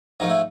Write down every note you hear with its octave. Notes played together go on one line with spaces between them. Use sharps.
G#2 F3 A3 D#4
E4